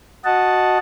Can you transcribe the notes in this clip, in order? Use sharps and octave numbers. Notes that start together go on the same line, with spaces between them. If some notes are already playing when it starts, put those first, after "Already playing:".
F#4 D#5 F#5 A5